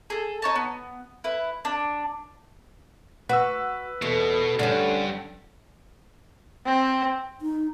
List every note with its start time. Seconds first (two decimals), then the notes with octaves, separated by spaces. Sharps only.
0.10 G#4 A4
0.42 D#4 C#5 A5
0.55 B3
1.24 E4 B4
1.65 D4
3.29 F#4 B4 E6
4.02 E2 B2 A4
4.59 G2 D3 C#4
6.65 C4
7.42 D#4